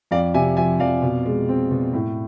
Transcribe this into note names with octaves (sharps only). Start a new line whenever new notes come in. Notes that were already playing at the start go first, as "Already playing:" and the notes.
F2 D5 F5
C3 E5 G#5
F3 E5 G#5
F2 D5 F5
B2
G#3
C4
B2
A2